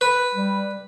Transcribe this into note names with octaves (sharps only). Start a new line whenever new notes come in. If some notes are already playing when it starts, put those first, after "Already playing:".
B4
G3